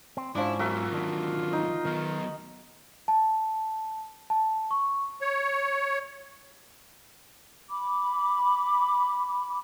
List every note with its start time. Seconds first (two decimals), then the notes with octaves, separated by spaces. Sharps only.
0.17 C4
0.35 G#2 F3 C#4 D4 E4 D6
0.59 E2 F#3 F4 F#4 A#4 E5
0.92 D#3 D4
1.53 D#4
1.85 D#3 F#3 B3
3.08 A5
4.30 A5
4.71 C#6
5.20 C#5
7.70 B5 D6